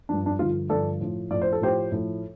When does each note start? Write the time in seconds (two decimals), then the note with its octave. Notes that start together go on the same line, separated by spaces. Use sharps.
0.09 G2 F3 D4
0.26 D4
0.39 G2 D3 F3 F4
0.69 G2 D3 F3 A4 D5
1.00 A2 F3
1.31 A2 F3 D5
1.42 C5
1.53 A4
1.61 A2 F3 G4 C5
1.92 A2 F3